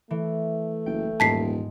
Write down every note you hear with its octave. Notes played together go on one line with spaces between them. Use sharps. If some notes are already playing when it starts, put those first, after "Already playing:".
E3 A3
F#1 G5
D#1 G#2 G#3 A5 C6 B6 C7